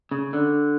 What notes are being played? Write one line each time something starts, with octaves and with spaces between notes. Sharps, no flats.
C#3
D3